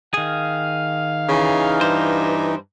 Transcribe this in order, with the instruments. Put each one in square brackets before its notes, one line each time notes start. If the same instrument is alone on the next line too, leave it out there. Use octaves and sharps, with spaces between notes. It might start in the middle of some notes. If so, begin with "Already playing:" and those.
[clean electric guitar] D#3 G#4 [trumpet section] F5
[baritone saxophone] C#3 [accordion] E3 D#4
[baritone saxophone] G2 [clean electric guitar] C5